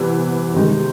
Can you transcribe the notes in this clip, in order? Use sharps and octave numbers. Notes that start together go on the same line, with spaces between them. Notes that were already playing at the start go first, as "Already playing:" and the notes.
Already playing: C3 E3 G3 B3
C3 D#3 G#3